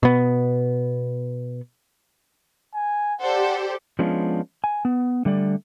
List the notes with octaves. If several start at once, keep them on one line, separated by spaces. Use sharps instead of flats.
B2 B3
G#5
G4 A4 C5 D5 F#5
F3 G#3 B3 C#4 D4 F4
G#5
B3
D3 G3 A3 D5